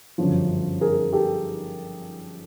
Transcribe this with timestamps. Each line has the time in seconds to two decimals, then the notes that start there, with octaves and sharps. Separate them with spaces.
0.18 G1 F#2 C#3 F3
0.81 G#4 A#4
1.13 G4 A4